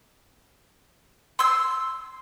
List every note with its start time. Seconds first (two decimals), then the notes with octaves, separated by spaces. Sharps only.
1.39 C6 E6